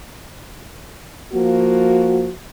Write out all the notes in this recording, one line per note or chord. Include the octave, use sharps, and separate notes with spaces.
F3 A#3 F#4